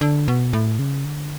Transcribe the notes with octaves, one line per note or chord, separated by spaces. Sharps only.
D3
B2
A2
C#3
D3